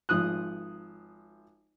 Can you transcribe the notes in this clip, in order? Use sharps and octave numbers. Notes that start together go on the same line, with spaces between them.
G#1 F3 D#6 F#6